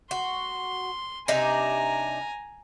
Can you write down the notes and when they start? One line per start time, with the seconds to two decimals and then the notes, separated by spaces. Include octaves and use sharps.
0.11 F#4 C6
1.28 C3 D4 D#4 G#5 A#5